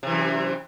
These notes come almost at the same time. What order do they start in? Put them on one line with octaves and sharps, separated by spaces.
C3 E3 F#2